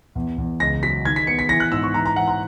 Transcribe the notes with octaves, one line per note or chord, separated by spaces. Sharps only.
E2
E2
C#2 A#6
F#3 B6
D#3 G#6
B6
B3 C#7
B6
E3 A#6
F#6
G#2 E6
C#6
E3 A#5
A#5
E3 F#5
A#5